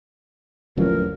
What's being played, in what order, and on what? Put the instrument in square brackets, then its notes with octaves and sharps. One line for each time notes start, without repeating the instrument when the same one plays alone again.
[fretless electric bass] E1 D3 F#3 [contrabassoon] A1 [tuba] F3 [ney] A#4